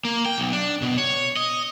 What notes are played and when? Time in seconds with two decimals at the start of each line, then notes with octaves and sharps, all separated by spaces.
0.05 A#3
0.26 G5
0.38 B1
0.53 D4
0.82 B2
0.98 C#5
1.37 D#5